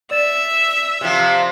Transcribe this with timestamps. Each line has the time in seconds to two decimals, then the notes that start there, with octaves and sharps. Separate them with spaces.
0.11 D5 E5 E6 A6 E7
1.01 C3 F3